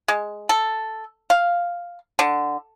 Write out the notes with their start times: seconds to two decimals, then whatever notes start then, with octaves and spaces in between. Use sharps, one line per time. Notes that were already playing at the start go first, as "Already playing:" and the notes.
0.08 G#3
0.49 A4
1.30 F5
2.19 D3